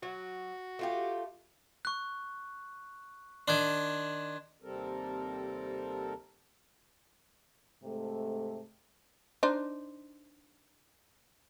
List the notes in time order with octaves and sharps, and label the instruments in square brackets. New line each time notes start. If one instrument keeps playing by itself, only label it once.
[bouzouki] F#3 [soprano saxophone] F#4
[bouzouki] A3 F4 G4
[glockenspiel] C#6 F#6
[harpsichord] D#3 D4 [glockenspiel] C6 F#6 G#6
[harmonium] D#2 C3 G3 C4 A4 A#4
[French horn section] G#2 C3 A3
[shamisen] D4 D#4 C5